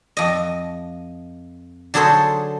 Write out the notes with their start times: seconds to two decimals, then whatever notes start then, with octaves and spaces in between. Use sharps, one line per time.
0.17 F2 D#5
1.94 D3 F#3 G#4 A4 C5 C#5